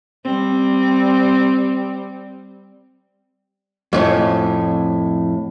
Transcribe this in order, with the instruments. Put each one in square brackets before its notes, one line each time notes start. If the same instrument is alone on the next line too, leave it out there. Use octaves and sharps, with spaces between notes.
[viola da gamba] G3 C4
[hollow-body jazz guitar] F2 A2 C#4